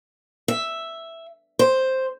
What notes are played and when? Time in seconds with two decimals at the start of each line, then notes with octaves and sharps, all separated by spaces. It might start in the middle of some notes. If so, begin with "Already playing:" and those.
0.48 E5
1.59 C5